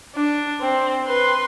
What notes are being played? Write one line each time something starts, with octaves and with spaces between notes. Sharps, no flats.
D4
C4
B4 C6